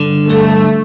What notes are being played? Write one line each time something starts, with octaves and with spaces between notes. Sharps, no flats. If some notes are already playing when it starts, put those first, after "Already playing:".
Already playing: G2 D3
G2 A3